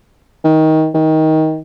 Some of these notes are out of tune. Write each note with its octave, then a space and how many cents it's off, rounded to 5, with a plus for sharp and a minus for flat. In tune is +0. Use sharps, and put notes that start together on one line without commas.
D#3 +20
D#3 +20